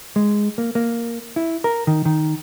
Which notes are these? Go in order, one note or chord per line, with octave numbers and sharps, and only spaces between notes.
G#3
A#3
A#3
E4
A#4
D#3
D#3